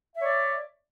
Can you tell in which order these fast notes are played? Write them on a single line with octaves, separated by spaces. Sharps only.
E5 C#5 D5